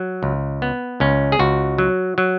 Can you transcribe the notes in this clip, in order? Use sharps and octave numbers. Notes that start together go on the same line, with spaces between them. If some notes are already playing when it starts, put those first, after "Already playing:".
Already playing: F#3
C#2
B3
C#2 C#4
G#4
C#2 F#4
F#3
F#3